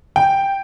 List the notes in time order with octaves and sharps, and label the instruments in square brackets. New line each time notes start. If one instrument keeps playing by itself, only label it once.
[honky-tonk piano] G5